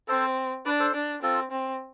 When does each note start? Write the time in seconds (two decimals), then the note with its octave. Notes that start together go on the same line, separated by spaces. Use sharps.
0.08 C4 A4 C5
0.66 D4 B4 D5
0.80 A4 C5
0.95 D4
1.22 C4 F4 A4
1.51 C4